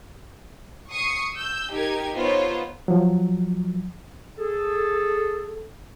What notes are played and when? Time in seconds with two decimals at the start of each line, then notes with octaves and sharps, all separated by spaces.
0.89 C#6 D#6 C7 C#7
1.35 E6 G6
1.72 D#4 G4 A#4 G#6
2.16 B3 D#4 F4 C5 C#5
2.88 F3 F#3
4.38 G#4 A4